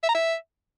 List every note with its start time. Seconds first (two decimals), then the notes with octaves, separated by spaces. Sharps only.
0.03 E5
0.09 A#5
0.14 E5